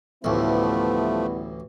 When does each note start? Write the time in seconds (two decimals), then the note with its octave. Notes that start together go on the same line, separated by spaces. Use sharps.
0.24 A1 D2 F3 G3 A3 B3 E4